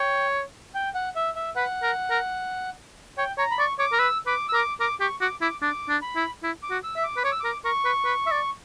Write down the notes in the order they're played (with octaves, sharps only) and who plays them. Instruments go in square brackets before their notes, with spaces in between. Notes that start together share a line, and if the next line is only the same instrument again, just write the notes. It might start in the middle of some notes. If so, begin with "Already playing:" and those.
Already playing: [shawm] C#5 [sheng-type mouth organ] G5
[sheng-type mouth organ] G5
F#5
E5
E5
[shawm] B4 [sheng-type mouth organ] F#5
[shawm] A#4
A#4
[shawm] C#5 [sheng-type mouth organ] G5
[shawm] C#5 [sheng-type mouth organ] A#5
[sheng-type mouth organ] B5
[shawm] D5 [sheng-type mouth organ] C#6
[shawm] C#5 [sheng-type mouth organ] D6
[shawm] A#4
[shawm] B4 [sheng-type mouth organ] E6
[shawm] B4 [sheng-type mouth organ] D6
[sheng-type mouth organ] E6
[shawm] A#4 [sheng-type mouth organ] D6
[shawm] A#4 [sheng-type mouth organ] D6
[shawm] G4 [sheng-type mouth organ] C#6
[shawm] F#4 [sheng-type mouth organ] D6
[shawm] E4 [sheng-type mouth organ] D6
[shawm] D4 [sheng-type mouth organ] D6
[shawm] D4
[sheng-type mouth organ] B5
[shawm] E4
E4
[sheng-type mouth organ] D6
[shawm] F#4
[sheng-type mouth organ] E6
[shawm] E5
[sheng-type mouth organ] D6
[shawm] B4
[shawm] C#5 [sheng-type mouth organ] D6
[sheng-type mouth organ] E6
[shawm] A#4 [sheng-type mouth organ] D6
[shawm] A#4 [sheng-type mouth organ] C#6
[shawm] B4
B4
E5
D5